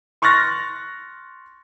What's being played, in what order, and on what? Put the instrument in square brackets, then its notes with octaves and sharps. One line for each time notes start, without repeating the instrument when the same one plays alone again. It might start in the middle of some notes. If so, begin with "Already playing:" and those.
[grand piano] C6 C#6 F6 F#6 A6 A#6